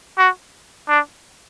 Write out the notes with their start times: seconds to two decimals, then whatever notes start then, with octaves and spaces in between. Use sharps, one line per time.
0.18 F#4
0.88 D4